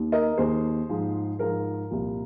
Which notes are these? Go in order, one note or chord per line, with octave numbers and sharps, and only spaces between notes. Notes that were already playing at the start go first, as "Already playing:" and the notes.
Already playing: D#2 D#3
A#4 D#5
D#2 D#3 G#4 C5
G#2 F3
G#2 F3 A#4
C2 A#2 F3